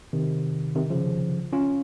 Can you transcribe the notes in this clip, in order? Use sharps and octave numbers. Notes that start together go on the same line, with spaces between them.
C3 D#3
C3 D#3
C#3 F3
C#4 F4